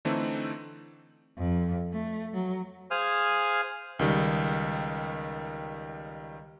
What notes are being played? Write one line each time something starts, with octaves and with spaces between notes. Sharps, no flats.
D3 E3 A3 C4 D#4
F2
A3
F#3
G#4 C5 F5 G#5 D#6 F6
C#2 D#3 G3